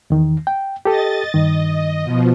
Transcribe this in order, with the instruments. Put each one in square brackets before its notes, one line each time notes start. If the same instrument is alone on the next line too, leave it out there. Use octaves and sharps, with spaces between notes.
[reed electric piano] E2 D#3
G5
[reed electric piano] G4 A4 [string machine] D#5 A6
[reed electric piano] G2 D#3 [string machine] D#5
[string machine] B2 F3